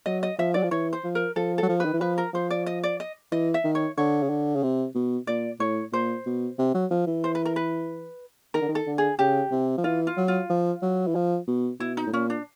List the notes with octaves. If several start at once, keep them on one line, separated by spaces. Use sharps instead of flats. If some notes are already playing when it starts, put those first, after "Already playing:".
F#3 D#5
D#5
F3 E5
F#3 D5
F3
E3 C#5
C5
F3
A#4
F3 A4
A4
F#3
F3
B4
D#3
E3
F3 B4
A#4
F3 C5
D5
D#5
D5
D#5
E3 D#5
E5
D#3
C#5
D3 C#5
C#3
D3
C#3
C3
B2
A#2 D5
A2 C#5
A#2 C5
B2
C3
F#3
F3
E3
C5
B4
A#4
B4
D#3 A#4
D3
D#3
A4
D3
G#4
C#3 G4
C3
F3
E3 F4
F4
F#3
F4
F3
F#3
E3
F3
B2
B2 E4
D#4
A2
A#2 C#4
D4